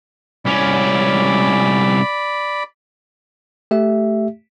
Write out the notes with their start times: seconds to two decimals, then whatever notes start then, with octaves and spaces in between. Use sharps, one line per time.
0.45 C2 C#4 D5 B5
3.71 A3 G4 E5